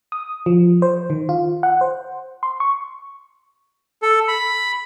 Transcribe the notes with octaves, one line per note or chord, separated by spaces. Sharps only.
D#6
F3
C5
D#3
F4
F#5
C5
C6
C#6
A4
B5